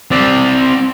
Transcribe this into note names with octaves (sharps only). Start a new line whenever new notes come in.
C4 D5